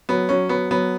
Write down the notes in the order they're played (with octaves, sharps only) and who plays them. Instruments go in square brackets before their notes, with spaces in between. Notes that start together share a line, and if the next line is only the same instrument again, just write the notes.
[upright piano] F#3 [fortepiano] B3
[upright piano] F#3 [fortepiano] C#4
[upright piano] F#3 [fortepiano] B3
[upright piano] F#3 [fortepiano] B3